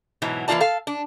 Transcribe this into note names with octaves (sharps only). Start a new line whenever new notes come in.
G#2 B2 E3 F#3
E3 A#3 D#4 F4 D5 A5
A4 F5
D4